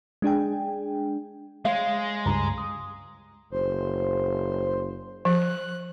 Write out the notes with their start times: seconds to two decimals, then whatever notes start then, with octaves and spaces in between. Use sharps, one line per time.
0.22 G#3 D4 G#4 G5
1.65 G#3 C#5 F5
2.26 C#2 G2 A#5
2.58 D#6
3.51 F#1 C5
5.25 F3 F#6